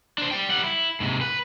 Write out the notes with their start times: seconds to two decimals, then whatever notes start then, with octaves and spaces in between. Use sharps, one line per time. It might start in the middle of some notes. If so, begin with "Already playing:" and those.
0.18 D4 C5
0.31 D5 G5
0.49 G3 F#5
0.64 E4
1.00 G#2 C3
1.21 B4